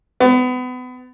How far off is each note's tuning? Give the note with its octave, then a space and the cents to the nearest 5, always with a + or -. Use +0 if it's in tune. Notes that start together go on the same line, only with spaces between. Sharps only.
B3 +30